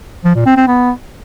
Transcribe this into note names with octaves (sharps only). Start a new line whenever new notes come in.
F3
A#2
C4
C4
B3